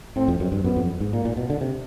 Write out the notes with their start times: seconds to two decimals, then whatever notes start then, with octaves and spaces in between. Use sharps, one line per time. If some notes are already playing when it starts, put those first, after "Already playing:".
0.16 A2 C4
0.28 F2
0.40 F#2
0.52 G2
0.64 F#2 B3
0.76 F2
1.00 G#2
1.13 A#2 A#3
1.25 A#2
1.37 B2
1.50 D3
1.61 C3